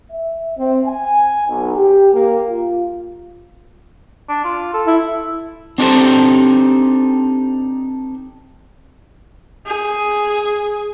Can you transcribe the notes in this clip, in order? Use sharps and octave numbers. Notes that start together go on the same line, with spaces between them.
E5
C4
G#5
B1
G4
A#3
F4
D4
F4
A4
E4
C4 D4 D#4 G4 A4 C5
G#4